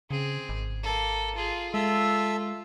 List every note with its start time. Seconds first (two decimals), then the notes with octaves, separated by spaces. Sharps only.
0.11 C#3 C4 G#4
0.49 G#1
0.83 A#3 A4
1.35 F4 G#4
1.74 G#3 F4 A4 E5 E6